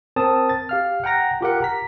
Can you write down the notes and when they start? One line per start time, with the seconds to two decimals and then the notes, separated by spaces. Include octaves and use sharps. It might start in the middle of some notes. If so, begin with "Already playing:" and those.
0.16 C4 A#4 A5 D#6
0.49 A6
0.69 G4 F5 F6
1.04 F#5 G5 A#5 A#6
1.41 F4 G4 A#4 F#5
1.63 A#5 B6